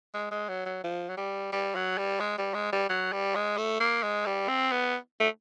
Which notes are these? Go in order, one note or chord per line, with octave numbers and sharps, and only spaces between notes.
G#3
G#3
F#3
F#3
F3
F#3
G3
G3
F#3
G3
G#3
G3
G#3
G3
F#3
G3
G#3
A3
A#3
G#3
G3
C4
B3
A3